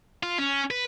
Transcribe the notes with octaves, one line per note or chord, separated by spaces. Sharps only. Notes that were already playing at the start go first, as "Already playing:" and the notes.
F4
C#4
B4